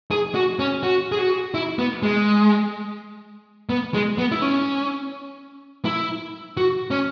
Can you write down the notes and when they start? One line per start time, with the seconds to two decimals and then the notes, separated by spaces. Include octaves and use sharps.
0.11 G#4
0.35 F#4
0.59 C#4
0.83 F#4
1.12 G#4
1.19 F#4
1.54 E4
1.79 B3
2.03 G#3
3.69 B3
3.94 G#3
4.18 B3
4.32 E4
4.42 C#4
5.85 E4
6.57 F#4
6.91 C#4